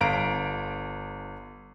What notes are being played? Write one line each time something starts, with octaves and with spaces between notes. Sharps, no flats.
G1 F5 A#5 D7